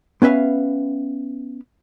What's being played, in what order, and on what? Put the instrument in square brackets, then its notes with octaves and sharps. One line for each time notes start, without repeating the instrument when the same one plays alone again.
[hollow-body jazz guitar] B3 C#4 B4 E5 F5